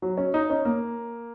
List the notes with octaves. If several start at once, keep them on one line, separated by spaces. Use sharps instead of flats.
F#3
C#4
D#4
C#4
A#3